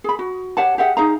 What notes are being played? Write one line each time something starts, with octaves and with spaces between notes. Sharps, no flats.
G#4 B5
F#4
G4 C#5 F#5 A5
G4 G#4 E5 F#5
D#4 G#4 F5 A#5